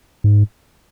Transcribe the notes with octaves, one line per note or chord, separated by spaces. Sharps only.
G#2